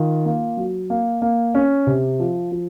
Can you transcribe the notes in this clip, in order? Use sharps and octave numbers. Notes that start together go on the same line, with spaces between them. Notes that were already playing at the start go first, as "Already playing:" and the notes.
Already playing: D#3 F4
A#3
F#3
A#3
A#3
C#4
C3
F3
F3